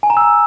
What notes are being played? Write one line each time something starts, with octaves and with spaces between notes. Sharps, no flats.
G#5
A#5
E6